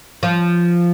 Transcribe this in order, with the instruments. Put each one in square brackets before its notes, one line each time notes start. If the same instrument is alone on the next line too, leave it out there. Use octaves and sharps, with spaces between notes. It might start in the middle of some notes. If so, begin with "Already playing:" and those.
[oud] F3